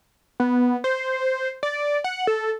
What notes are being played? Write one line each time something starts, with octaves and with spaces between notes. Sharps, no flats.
B3
C5
D5
F#5
A4